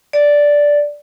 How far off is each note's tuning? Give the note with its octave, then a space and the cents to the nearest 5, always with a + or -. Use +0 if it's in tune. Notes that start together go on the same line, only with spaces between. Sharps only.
D5 -5